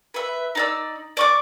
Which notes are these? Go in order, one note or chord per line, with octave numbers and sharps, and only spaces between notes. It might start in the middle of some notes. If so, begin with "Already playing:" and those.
B4 E5
D#4 D5 E6
D5 C#6 D6